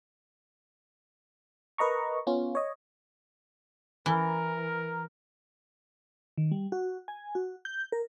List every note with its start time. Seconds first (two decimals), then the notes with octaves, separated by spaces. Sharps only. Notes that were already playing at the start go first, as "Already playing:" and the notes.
1.78 A#4 B4 D#5 A#5 C#6
2.27 B3 C#4 F4
2.55 C#5 D#5
4.06 E3 A#4
6.38 D#3
6.51 G3
6.72 F#4
7.08 G#5
7.35 F#4
7.65 G6
7.92 A#4